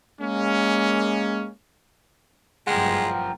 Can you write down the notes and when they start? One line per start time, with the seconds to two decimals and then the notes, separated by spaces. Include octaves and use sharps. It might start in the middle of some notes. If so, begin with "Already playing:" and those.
0.20 G#3 A#3 C#4
2.67 F#1 G2 F3 G#3 A#3 F4 F#5 G5